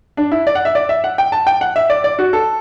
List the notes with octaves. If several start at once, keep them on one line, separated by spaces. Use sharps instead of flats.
D4
E4
D5
F#5
E5
D5
E5
F#5
G5
A5
G5
F#5
E5
D5
D5
F#4
A4